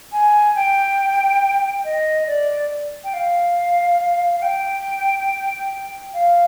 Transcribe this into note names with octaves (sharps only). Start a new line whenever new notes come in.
G#5
G5
D#5
D5
G5
F5
F5
G5
F5